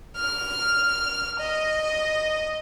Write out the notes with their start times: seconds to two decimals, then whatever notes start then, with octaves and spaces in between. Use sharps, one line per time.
0.16 F6
1.40 D#5